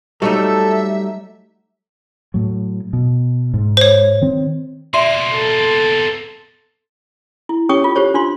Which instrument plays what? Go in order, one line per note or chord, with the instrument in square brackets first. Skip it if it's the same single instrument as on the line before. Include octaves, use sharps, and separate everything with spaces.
[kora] F#3 A3 [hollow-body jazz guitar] G3 D#4 [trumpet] A4 [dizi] E5
[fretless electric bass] A2 F#3
B2
G#2
[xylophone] C5 C#5
[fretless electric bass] D#3 C4
[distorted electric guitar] B2 A#3 [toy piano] F#4 D5 E5 [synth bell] C6
[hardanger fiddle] A4
[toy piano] E4
C#4 G4 C#5 G5 C#6 D#6
F4
G4 C5 C#5
D4 F4 C6